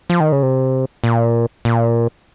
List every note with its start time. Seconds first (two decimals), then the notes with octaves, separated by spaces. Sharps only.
0.10 F3
0.20 D#3
0.32 C#3
0.43 C3
1.04 A#2
1.65 A#2